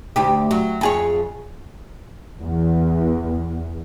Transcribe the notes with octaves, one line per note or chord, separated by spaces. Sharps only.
D2 G4
F#3
F2 G#4 C#5
E2